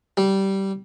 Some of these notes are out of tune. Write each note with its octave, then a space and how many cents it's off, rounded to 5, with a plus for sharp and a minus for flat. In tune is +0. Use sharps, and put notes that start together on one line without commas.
G3 -15